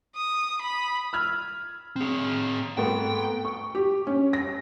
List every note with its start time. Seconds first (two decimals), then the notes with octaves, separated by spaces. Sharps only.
0.16 D#6
0.62 B5
1.13 E6 F6 G#6
1.96 C4 G#4
2.77 G#2 A3 B3 G5
3.45 C#6
3.75 G4
4.07 C#4
4.33 A#6